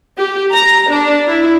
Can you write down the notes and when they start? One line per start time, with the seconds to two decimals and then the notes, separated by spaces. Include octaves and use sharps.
0.17 G4
0.52 A#5
0.90 D4
1.27 E4